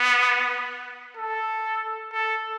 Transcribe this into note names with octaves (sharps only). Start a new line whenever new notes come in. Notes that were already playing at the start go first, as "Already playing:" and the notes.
Already playing: B3
A4
A4